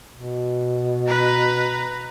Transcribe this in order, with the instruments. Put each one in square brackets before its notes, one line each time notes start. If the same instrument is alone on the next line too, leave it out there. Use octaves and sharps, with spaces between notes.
[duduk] B2
[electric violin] B4 A#5